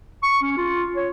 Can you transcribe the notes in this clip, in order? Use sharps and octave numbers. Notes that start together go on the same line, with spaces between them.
C#6
C#4
F4
C#5